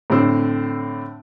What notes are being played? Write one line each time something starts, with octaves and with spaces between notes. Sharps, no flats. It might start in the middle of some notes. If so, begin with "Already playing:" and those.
A2 D3 C4 E6